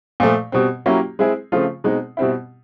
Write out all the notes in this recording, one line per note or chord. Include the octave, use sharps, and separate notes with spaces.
A#2 F3 A3
B2 G3 C4
F#3 A#3 C#4 E4 G4
G#3 C4 E4 G#4
C#3 F3 A3 C4 F4
B2 G#3 C4 D#4
B2 G3 C4 E4